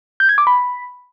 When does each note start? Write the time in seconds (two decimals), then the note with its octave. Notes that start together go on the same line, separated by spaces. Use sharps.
0.20 G6
0.29 G#6
0.38 D6
0.47 B5